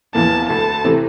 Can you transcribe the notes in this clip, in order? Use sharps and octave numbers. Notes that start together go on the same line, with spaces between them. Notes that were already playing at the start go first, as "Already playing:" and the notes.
F1 E2 E3 A#3 A5
D2 D3 A3 A5
C3 E3 A3 C4